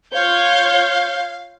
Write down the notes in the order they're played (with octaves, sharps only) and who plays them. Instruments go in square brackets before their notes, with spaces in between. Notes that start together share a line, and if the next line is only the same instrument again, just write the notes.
[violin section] F4 C#5 G6 [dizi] F5